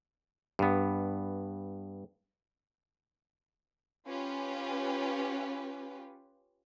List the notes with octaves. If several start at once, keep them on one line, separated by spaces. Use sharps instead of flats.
G2 B3
C#4 F4 G4 B4